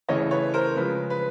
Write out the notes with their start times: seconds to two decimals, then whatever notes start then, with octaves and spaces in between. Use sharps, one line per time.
0.08 C#3 E3 A3 C#5 D#5
0.31 B4 C#5
0.54 A#4 C5
0.76 C#3 F3 G#3 B4
1.10 B4